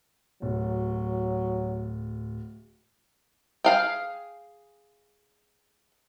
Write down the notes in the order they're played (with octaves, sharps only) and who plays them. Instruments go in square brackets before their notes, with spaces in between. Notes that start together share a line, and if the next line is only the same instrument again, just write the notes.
[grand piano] D1 [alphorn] F#3
[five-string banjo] G#4 F5 G5